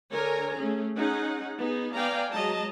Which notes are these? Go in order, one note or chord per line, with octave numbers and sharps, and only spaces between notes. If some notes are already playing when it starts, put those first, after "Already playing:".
D3 A#4 C#5 G#5 A#5
A3 C#4 G#4
C#4 D#4 G#4 F#5
B3 D#4 G#4
B3 D5 F5 G5 G#5 A#5
F#3 G#3 D#5 A5 A#5